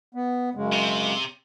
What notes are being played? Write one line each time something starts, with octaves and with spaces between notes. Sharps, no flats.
B3
F#2 C#3 G#3
C3